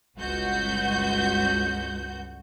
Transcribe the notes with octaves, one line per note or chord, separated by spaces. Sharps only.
G1 C#2 F#4 G6